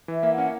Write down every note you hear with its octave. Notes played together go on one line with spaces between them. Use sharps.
E3
E5
A#3
F#5
C#4